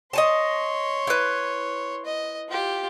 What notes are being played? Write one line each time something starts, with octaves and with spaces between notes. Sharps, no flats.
C#5 D#5 G#5 A5 C6
E4 B4
D#5
F4 G4